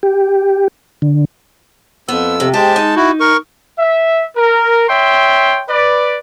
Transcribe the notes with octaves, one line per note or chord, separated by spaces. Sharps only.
G4
D3
F2 B3 E6
C3
G#3 G4 C5 A5
D#4
E4 F#4
A#4 C#6
E5
A#4
C#5 E5 G5 C6
B4 D5